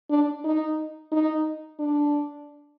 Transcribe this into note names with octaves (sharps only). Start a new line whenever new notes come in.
D4
D#4
D#4
D4